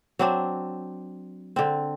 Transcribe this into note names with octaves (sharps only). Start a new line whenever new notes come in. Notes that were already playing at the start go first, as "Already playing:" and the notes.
F#3 C4 D4
D3 C4